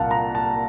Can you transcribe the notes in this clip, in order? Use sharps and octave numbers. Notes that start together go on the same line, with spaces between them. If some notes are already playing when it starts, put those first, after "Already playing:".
Already playing: C2 A#2 F5 F#5 A5
A#5
A5